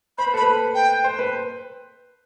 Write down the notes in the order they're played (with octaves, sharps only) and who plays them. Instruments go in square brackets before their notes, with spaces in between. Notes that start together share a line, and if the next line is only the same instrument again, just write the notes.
[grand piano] C5 [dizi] B5
[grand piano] B4
A4
[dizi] B5
[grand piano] B4
[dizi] G5
[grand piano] C5
B4